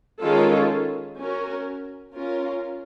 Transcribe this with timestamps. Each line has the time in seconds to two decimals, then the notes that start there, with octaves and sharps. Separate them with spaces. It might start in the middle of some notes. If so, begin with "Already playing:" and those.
0.20 D#3 G#3 C#4 F4 A4
1.17 C#4 F#4 A#4
2.14 C#4 F4 A#4